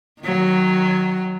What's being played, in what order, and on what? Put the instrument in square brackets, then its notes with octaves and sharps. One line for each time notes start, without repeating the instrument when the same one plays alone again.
[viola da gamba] D#3 F#3